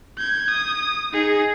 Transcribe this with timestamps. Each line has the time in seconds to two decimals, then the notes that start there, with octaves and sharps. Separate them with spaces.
0.18 G6 G#6
0.51 D#6
1.12 D#4 G#4